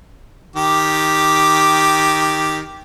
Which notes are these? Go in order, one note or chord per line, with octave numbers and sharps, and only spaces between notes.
D#3 G4 D6